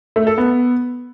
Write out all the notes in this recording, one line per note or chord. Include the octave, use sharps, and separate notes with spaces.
A3
A4
B3